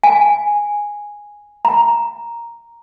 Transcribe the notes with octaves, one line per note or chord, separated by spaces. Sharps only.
G#5
A#5